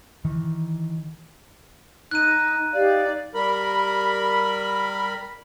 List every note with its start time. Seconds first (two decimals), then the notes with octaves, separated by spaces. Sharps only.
0.25 D#3 E3
2.11 D#4 F#6 D#7
2.73 D#4 G4 D5 F5
3.34 G3 A#4 B5